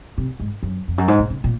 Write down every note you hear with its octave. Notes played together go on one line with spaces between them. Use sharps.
C3
G#2
F#2
F2
F#2
G#2
A#2
C#3
A#2